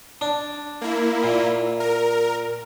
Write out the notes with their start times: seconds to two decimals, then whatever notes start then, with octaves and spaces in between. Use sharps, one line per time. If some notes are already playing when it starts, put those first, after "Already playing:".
0.21 D4
0.81 A#3 E4
1.23 A#2
1.80 A#4